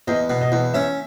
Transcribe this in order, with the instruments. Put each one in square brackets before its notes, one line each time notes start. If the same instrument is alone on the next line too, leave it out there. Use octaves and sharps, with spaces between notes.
[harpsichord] E2 [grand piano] D#5
[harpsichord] B2
[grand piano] D#5
[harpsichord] E2
[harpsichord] C#4 [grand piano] E5